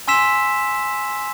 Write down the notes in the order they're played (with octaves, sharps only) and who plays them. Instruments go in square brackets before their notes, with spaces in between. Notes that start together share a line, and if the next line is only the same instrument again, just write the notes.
[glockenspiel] G#5 C6 E6 B6 E7